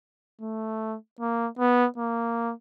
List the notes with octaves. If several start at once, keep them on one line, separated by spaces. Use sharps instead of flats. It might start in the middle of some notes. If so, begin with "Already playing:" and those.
A3
A#3
B3
A#3